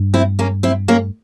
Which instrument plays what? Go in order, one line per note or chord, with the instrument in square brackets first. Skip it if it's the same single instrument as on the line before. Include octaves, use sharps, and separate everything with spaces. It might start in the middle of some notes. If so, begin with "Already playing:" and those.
Already playing: [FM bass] G2
[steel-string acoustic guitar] C4 E4
A#3 C#4
C4 E4
A#3 C#4